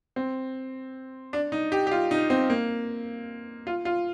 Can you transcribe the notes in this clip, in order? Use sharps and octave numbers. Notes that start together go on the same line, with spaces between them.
C4
D4
D#4
G4
G4
F4
D#4
C4
A#3
F4
F4